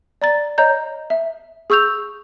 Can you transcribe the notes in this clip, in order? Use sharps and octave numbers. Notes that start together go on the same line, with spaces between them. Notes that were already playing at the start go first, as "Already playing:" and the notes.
D5 A#5 A6
C#5 D#5 A#5 G6
E5
G#4 C#6 E6 G6 F7